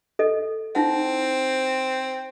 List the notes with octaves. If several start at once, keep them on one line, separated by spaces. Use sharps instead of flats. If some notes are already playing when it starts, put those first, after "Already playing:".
A4 D#5
C4 D#4 E4 F#5